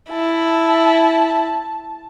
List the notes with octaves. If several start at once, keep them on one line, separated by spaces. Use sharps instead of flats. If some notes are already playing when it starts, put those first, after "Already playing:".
E4 A5